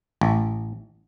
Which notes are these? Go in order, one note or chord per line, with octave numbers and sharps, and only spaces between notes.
A1